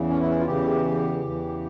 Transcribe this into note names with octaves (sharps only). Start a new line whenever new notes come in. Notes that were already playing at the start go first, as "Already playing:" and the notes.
Already playing: E2 C#3 E3
C#4
E4
F4
E2 C#3 E3 G4
E2 C#3 E3